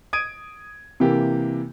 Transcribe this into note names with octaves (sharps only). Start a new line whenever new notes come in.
D#6 G#6 D7 D#7
C3 E3 A#3 G4